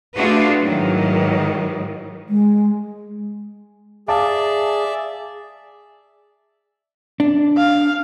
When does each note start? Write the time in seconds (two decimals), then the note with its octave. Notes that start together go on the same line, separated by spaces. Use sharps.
0.15 A3 D4 F4 F#4 G#4 B4
0.62 G#2 D#3 E3 F#3
2.29 G#3
4.08 G#4 D5 E5 F5 A5 D6
7.20 D4
7.57 F5